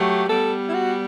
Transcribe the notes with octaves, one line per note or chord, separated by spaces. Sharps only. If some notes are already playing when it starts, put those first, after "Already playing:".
Already playing: F#3 A3 G4
G3 B3 A4
E4
F#4